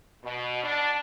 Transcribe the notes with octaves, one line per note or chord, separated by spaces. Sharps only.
B2
D4